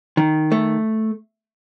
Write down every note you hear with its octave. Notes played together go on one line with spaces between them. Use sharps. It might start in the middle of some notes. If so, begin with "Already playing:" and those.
D#3
A3